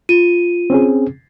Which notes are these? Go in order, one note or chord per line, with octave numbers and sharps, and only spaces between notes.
F4 D#7
C4 C#4 G#4